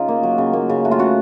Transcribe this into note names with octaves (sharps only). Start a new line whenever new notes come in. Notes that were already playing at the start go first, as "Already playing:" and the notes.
Already playing: C#3 D#4 F4
A#3
F#3
C#3
A#3
C#3
A3 F#4
F4
C#3 F#4